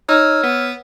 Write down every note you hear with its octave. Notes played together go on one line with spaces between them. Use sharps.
D#4 C#5 E6 F6
B3